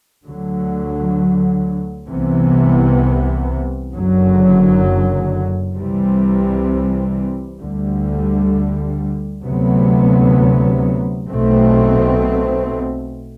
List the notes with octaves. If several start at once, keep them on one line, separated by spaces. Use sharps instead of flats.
D2 D3 F#3
C2 C3 E3 B3
F#1 F#2 D3 F#3
C2 C3 E3 G3 C4
D2 D3 G3
D2 C3 F#3 B3
B1 B2 A3 C4